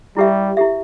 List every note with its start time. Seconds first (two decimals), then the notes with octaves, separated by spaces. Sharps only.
0.17 G3 E4 G4 E5
0.57 E4 G4 E5